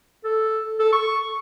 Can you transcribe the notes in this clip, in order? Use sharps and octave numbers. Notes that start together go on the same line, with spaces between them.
A4
A4
C#6